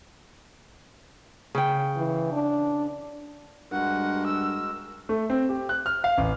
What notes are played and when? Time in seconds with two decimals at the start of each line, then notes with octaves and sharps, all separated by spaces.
1.55 C#3 G5
1.97 E3
2.33 D4
3.72 G2 G#3 F#4 A#4 F#5
4.27 E6
5.09 A3
5.30 C4
5.49 G4
5.69 F#6
5.86 F6
6.04 F5
6.18 A1